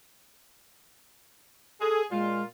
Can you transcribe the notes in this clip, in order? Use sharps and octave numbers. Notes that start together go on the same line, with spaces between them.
G#4 A4
A#2 G#3 F4